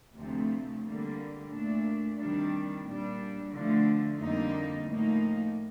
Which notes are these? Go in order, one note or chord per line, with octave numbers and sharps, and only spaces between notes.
D2 C3 F3 A3
D3 G3 A#3
A#2 A3 D4
C3 D#3 G3 D4
A#2 G3 D4
D3 F3 A3
F2 D3 G3 A#3 D#4
A2 F3 A#3 D#4